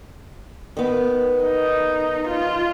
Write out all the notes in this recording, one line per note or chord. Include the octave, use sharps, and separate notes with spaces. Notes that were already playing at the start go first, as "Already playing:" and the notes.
D#3 B3
D#4
F4